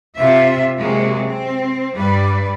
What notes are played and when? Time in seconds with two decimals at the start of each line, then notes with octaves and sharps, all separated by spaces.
0.17 C3 F4 E5
0.77 C3 F#3 G#3 A#3
1.25 C4
1.94 G2 G3 B4 D5